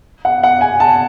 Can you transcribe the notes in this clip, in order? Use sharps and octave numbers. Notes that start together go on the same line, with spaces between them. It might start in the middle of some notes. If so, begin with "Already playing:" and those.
F#5
F#5
G#5
A5